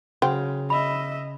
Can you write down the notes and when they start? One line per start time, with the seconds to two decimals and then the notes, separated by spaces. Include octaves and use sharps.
0.22 C#3 F#3 C5 G5
0.70 D#5 E5 B5